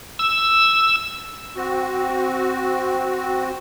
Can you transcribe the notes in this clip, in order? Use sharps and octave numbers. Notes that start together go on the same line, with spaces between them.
E6
C4 F#4